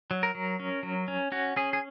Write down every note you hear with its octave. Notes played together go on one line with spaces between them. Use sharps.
F#3
A#4
F#3
C#4
F#3
C#4
C#4 F#4
C#4 G#4
G#4